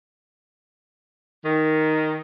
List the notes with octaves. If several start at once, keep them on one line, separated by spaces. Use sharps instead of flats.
D#3